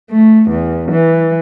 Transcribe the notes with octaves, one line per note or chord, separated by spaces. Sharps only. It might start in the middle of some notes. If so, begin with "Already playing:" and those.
A3
E2
E3